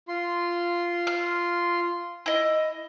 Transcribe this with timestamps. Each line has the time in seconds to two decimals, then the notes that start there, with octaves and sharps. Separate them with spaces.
0.08 F4 C6
1.07 F6
2.26 E4 D#5